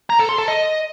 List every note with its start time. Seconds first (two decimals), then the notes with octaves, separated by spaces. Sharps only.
0.10 A#5
0.19 A4
0.29 C6
0.38 A4
0.48 D#5